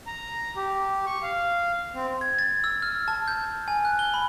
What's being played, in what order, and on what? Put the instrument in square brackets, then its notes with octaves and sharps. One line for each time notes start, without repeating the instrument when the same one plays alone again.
[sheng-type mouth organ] A#5
G4
C#6
F5
C4
[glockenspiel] G#6
A6
E6
F6
A5
G6
G#5
F#6
G7
B5